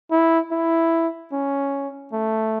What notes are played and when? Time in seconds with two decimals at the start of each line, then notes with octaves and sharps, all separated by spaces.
0.11 E4
0.52 E4
1.32 C#4
2.13 A3